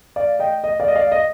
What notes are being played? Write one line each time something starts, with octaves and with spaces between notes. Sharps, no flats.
D5 F5
D#5 G5
D#5
D5 F5
D#5
D5 F5
D#5